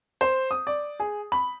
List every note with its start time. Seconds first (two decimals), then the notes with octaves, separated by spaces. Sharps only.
0.21 C5
0.51 D#6
0.67 D5
1.00 G#4
1.32 B5